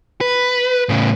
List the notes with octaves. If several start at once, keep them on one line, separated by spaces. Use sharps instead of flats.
B4
A2 C#3